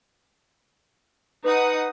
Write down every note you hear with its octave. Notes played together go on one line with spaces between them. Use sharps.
D#4 B4 F#5 D#6